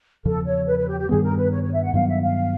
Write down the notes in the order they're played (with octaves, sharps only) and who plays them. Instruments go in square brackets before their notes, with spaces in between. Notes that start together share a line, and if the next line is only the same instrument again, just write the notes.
[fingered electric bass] E2 C#3 F3 [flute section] A4
[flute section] C#5
B4
B4
G4
G4
[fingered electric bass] G2 D#3 G3 B3 [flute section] G#4
[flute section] A#4
B4
C#5
C#5
E5
F#5
[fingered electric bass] G2 D#3 F#3 B3 [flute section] F5
[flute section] E5
F5